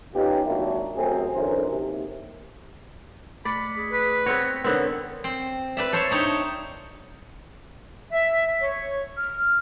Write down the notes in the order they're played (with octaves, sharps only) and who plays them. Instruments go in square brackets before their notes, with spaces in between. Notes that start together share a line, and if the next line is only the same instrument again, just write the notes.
[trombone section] B3 C#4 D#4 F4 G4
G#1 A#2 D#3 F#3 D4 E4
A1 F#2 A3 C4 G#4
B1 F#2 D3 E3 A#4 C5
D#2 C3
[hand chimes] A3 B6 C#7 [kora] D5 [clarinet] B5
[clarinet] G#4
[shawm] B4
[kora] B3 C4 C#5 [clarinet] F#5 [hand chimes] A#6
[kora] D3 B3 C4 [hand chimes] A#4 C#5
[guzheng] C4
B4 D5 E5
A4 C5 C#5 E5
D4 D#4 C#5 G5
[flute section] E5
C#5
F6